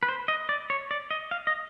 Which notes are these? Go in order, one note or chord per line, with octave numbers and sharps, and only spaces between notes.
B4
C5
D#5
D5
C#5
D5
D#5
F5
D#5